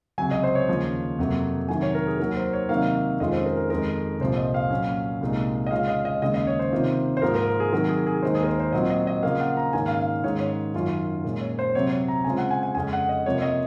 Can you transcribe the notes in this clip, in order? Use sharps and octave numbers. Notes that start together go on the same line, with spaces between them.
C#2 C3 F#3 G#5
D#5
C5
C#5
D#2 C#3 F3
F2 C3 F#3 A#3
C3 D#3 F#3 G#5
C#5
A#4
G#4
D#2 D#3 F#3 A#4
C5
C#5
C3 D#3 F#3 A#3 D#4 F5
F2 D#3 G#3 C#4 F4 D#5
C5
A#4
A#4
F2 D#3 G#3 A#4
C2 A#2 F3 C5
D#5
F5
A#2 F#3 C#4
C2 A#2 G#3 D#4
D#5
C#3 G#3 C#4 F4 F5
D#5
D#5
D#2 C#3 G#3 C#4 D#5
D#5
C#5
C5
C3 D#3 A#3 F4
C5
G#2 F3 A#3 F4 A#4
A#4
G#4
C3 D#3 F#3 A#4
G#4
G#4
D#2 D#3 G#3 D#4 C5
G#4
A#4
C5
C5
A#2 F#3 C4 F4 D#5
D#5
D#5
C#3 F3 A#3 F4 F5
F#5
A#5
G#2 D#3 A#3 C#4 G#5
F5
F5
G#2 D#3 G#3 C#4 C#5
C#5
F#2 D#3 F#3 C#4 F4
A#2 G#3 C#4
C#5
C5
C3 F#3 C4 C#5
C#5
A#5
C#3 G#3 C4 F4 G#5
F#5
G#5
G#5
F2 C#3 G#3 C#4 G#5
F#5
D#5
C3 F3 A#3 C#5
D#5